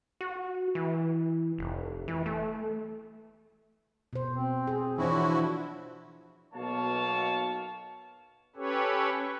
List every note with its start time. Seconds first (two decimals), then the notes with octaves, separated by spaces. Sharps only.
0.21 F#4
0.75 E3
1.58 F1
2.08 E3
2.26 A3
4.13 B2 C5
4.34 C4
4.67 G#4
4.98 E3 F3 D4 E4 F#4 C5 C#5
6.54 B1 B2 A#3 C#5 F5 A5
8.56 C#4 G4 A4 B4 C#5